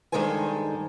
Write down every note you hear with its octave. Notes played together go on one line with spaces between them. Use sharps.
G2 D#3 G#3 A4 C5 G#5